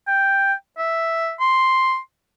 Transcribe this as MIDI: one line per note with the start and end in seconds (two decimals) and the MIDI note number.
0.07 0.54 79
0.78 1.33 76
1.40 1.98 84